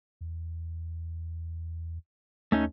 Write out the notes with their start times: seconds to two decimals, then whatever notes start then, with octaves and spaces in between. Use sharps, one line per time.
0.21 E2
2.52 D#2 A3 C#4 D#4